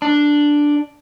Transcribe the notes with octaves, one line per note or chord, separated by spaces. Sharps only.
D4